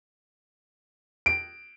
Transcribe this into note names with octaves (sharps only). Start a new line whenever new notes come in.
D7